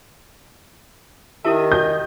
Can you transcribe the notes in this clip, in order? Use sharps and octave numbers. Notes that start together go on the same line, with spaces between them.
D#3 E4 G4 E5 A5 D#6
D#5 G6